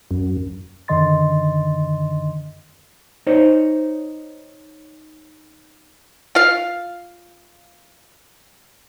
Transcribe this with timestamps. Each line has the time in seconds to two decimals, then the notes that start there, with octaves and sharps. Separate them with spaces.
0.11 F#2
0.88 F#2 D3 D#3 D#5 C6 A6
3.27 D#4 C5 C#5
6.35 F4 F5